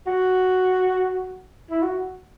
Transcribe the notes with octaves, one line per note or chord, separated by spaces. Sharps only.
F#4
E4
F#4